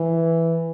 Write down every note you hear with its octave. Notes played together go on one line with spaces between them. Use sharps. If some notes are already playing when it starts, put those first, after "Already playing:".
Already playing: E3